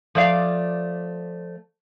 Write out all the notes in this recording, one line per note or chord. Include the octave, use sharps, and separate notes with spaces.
F3 A3 D5 F5